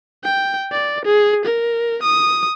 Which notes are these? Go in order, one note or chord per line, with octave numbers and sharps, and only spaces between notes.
G5
D5
G#4
A#4
D#6